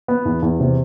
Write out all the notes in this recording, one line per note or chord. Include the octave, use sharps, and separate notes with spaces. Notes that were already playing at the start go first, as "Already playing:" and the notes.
B3
E2
E2
C3